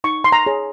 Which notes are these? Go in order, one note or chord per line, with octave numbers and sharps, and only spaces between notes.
D#4 C#6
C6
A#5
G#4 C#5